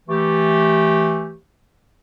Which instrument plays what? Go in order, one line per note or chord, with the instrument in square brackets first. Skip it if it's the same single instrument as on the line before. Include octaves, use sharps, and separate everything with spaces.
[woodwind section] E3 A3 G4